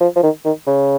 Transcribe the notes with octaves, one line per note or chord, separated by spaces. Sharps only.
F3
F3
D#3
D#3
C#3